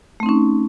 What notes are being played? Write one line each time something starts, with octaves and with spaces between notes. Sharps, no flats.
A3 C4 C#4 D#4